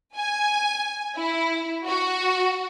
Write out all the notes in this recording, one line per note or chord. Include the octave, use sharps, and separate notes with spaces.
G#5
E4
F#4